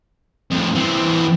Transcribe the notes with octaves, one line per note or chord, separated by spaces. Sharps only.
F2 A2
E3 C4